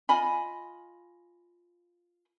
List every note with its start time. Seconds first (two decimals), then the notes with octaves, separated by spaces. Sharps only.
0.09 F4 D#5 G#5 B5